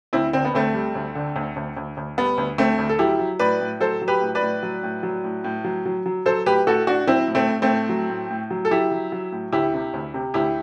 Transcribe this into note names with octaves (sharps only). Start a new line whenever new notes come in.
D2 C4 E4
D3 C4
B3
D2 A3 C4
G3
D2
D3
D2
D2
D2
D2
G3 B3
D2
D2 A3 C4
D2
A4
F#3 E4 G4
F#3
A2 B4 D5
A2
F#3 A4 C5
F#3
G4 B4
A2
B4 D5
A2
F#3
A2
F#3
A2
A2
F#3
F#3
F#3
F#3 A4 C5
A2 G4 B4
A2 F#4 A4
A2 D4 F#4
F#3 C4 E4
A2
A3 C4
A2
A3 C4
A2
F#3
A2
A2
F#3
A4
F#3 E4 G4
F#3
F#3
A2
D2 E4 G4
C3
D2
C3
D2 E4 G4